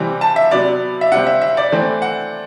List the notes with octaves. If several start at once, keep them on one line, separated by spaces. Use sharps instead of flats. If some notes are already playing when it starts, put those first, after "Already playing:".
Already playing: C3 E3 G3 C4
A5
E5
C3 F#3 B3 D5
E5
C3 G3 C4 F#5
E5
E5
D5
E3 A3 C4
F#5